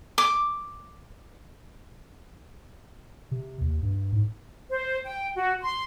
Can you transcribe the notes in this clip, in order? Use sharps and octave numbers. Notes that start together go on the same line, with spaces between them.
D6
C3
D#2
G2
G#2
C5
G5
F#4
C6